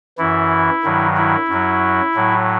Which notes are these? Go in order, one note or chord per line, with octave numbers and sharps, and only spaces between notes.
F#2 E3 E4
G2 D#3 F#3
E4
F#2 F#3
A2 F#3